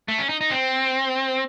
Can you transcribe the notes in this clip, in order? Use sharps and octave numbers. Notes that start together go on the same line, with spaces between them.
A3
C#4
D#4
D#4
C4